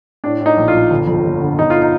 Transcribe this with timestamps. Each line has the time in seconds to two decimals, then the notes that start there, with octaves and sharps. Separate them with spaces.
0.24 A2 D4
0.41 A2
0.46 D#4
0.57 A#1
0.68 F4
0.75 A#1
0.91 G1
1.07 F2
1.25 G1
1.41 D3
1.59 G1 D#4
1.70 F4
1.82 D#4